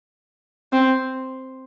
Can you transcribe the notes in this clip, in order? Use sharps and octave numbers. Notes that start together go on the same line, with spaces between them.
C4